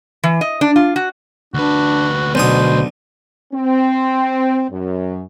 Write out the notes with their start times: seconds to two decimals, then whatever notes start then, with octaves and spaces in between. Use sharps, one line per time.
0.24 E3
0.41 D#5
0.61 D4
0.76 F4
0.96 F#4
1.54 D2 D4 F#4 B4
2.35 B1 B2 D3 C5 D#6
3.53 C4
4.70 F#2